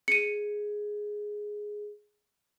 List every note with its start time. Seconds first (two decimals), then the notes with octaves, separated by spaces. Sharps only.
0.08 G#4 C#7 D#7